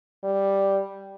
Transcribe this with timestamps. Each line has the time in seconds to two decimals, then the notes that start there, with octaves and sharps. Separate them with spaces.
0.24 G3